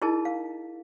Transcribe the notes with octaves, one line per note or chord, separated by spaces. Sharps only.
D#4 E4 G#4 A#4 D#5 A5
F5